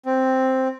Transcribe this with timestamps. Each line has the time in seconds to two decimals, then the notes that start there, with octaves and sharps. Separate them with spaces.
0.06 C4